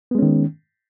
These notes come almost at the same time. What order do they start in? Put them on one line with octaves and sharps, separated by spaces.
B3 G#3 C#4 D#3